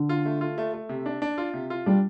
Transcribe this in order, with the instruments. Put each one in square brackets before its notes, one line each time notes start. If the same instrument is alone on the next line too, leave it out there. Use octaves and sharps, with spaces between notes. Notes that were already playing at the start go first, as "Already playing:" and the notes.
Already playing: [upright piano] D3
[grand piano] F4
A3
F4
A3
A3
C3
D4
D4
F4
C3
F4
[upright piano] G3 [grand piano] D4